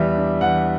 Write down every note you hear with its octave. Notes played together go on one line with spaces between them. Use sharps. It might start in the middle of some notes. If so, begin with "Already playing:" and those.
Already playing: E2 G3 E5
D4
E2 F#5